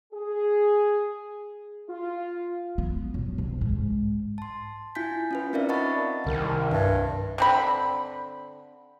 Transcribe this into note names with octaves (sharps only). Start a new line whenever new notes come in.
G#4
F4
B3
B1
C2
G#2
A5 C6
E4 F4 G#5 G6 B6
C#4 F4 B4
C4 D#4 A#4 D5 E5 F5
D#5 F#5 A5 B5 C#6 A6
C2 D#3
G2
D3 C4 B5